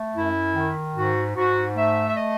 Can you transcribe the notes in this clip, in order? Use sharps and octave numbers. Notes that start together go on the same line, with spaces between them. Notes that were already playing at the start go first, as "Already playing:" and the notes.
Already playing: A3
F#2 E4
D#3
G#2 F#4
G#2 F#4
A3 E5
E5
D#5